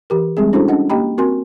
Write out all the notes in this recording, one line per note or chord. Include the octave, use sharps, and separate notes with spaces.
E3 G4 A#4
G3 G#3 C4 G#4
C#4 D4 E4 F#4 A4 C5
C#4 D4 D#5 F#5
A#3 G4 D#5 G5 A#5 B5
C4 F#4 A#4 G#5 C6